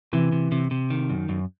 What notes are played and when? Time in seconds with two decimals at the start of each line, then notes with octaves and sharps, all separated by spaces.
0.13 C3 E3
0.32 C3
0.52 C3
0.71 C3
0.90 D#3
1.10 F#2
1.29 F#2